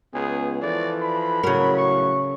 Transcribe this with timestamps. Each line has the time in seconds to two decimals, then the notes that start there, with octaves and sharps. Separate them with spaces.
0.14 C#2 B3 G#4
0.62 E3 F3 A4 D5
1.01 B5
1.43 A2 C#3 F#3 A#4
1.76 C#6